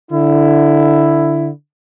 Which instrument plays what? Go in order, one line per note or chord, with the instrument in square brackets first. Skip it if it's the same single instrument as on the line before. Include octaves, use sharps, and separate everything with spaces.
[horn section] D3 E4